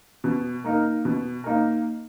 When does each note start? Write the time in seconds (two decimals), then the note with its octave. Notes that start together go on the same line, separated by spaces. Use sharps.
0.24 B2
0.64 A#3 D#4 A#4
1.05 B2
1.44 A#3 D#4 A#4